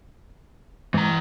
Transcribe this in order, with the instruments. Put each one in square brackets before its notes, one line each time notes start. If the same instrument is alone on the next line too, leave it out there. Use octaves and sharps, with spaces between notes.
[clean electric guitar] G#2 [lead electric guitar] E3 A#5